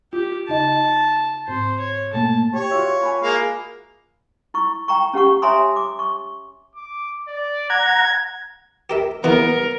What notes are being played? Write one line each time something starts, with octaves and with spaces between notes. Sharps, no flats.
F4 G4
C#3 D#4 D#5 A5
G#2 C4 C5
C#5
B2 A3 A#3 A5
G4 C#5
F4 F#4 E5
G#5 B5 C#6
G#3 A#3 F5
E4 C#6
G5 A#5 C#6
C#4 G4 F#5 C#6
C#5 E5 G#5 A#5 C6 D#6
D6
C#6
D6
D5
F#5 A#5 G#6
G4 A#4 E5
E3 A#3 B3 A#4